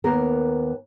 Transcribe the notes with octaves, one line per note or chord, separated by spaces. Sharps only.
D#2 B3 A#4